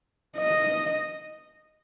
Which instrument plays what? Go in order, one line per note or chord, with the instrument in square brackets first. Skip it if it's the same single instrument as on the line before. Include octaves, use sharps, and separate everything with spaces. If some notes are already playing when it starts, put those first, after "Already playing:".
[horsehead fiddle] D#5